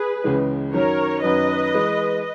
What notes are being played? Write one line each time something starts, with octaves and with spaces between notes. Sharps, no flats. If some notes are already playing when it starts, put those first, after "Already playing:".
Already playing: G#4 B4
C#2 C#3 E3 G#3
F#2 D#3 F#3 C#4 A#4 C#5
F#2 D#3 F#3 C#4 B4 D#5
E3 G#3